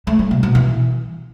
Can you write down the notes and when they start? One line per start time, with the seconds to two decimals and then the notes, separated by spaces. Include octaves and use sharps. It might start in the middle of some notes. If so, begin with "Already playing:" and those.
0.07 A3
0.19 G3
0.31 C3
0.43 B2
0.55 E3